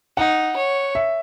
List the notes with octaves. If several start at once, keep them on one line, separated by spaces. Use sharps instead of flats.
D#4 F#5
C#5
E5